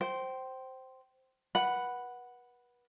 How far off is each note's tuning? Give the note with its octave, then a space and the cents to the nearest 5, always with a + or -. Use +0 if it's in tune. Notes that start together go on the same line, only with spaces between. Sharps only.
C5 +0 G5 -25
B4 -30 F#5 +0 B5 +0